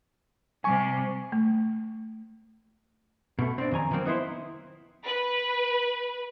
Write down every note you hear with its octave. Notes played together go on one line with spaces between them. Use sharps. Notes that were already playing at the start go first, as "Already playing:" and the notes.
C3 G3 G#5 C#6
A3
B2 A3
C4 D4
F2 D#3 G#5 A#5
D#3 F3 F#3 A#3 C4
B3 D#4 E4 C5
B4